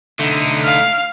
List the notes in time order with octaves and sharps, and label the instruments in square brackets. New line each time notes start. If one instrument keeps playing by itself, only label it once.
[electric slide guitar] D3 [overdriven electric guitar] A3 D#4
[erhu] F5